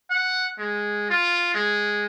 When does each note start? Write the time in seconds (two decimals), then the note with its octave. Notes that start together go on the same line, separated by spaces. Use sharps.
0.10 F#5
0.58 G#3
1.10 F4
1.54 G#3